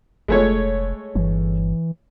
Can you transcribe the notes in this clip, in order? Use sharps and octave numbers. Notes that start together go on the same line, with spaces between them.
F1 G#3 A3 C#5
G1 E3